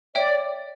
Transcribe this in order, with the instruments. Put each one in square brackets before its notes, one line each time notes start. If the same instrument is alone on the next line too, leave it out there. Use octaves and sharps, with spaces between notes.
[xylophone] C#5 E5 G5 [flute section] D5